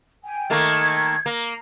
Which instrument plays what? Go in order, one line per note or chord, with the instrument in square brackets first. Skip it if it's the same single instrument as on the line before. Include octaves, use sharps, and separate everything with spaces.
[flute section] G5 G#5
[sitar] D#3 A3 A#3 [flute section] G#6
[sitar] A#3